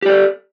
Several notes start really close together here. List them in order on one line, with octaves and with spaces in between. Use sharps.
G4 D5 A4